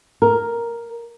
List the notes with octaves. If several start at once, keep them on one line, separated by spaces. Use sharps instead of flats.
A#4